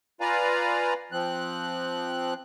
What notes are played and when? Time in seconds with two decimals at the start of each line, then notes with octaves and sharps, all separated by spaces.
0.21 F4 B4 D5 F5 G#5 A#5
1.12 F3 C4 F#6